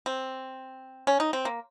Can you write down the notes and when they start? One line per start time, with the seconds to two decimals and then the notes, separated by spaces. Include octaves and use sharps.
0.06 C4
1.07 C#4
1.20 D#4
1.33 C4
1.45 A#3